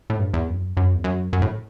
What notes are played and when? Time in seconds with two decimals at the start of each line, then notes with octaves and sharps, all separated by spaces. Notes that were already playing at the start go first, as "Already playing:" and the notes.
0.10 A2
0.19 G2
0.34 E2
0.48 F#2
0.77 F#2
0.95 E2
1.04 F#2
1.33 F#2
1.42 A2